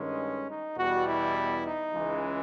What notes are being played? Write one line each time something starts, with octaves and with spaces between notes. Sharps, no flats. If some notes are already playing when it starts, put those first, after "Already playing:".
Already playing: G2 D#3 G#3 C#4
D#4
E2 B2 G3 F#4
E4
D#4
C#2 C#3 E3 G#3